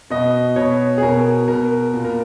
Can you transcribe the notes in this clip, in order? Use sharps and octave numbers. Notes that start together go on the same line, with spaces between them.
B2 D#5
B2 C#5
G#4
B2 A#4
B2 A#4
A#2
A#4